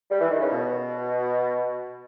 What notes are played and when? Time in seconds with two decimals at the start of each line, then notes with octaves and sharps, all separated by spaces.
0.11 G3
0.21 E3
0.31 D#3
0.40 C#3
0.50 B2